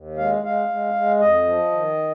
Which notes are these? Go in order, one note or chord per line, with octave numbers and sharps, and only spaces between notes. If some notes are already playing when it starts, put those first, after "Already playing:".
Already playing: D#2
G#3 F5
G#3 F5
G#3
G#3
F2 D#5
F3
D#3